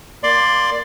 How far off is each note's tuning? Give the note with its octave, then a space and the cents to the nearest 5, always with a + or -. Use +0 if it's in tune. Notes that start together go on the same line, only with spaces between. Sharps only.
A#3 +0 D5 +10 C6 +0